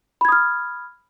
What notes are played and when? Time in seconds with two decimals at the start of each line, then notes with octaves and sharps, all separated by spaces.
0.21 B5
0.25 G#6
0.29 D#6
0.32 F6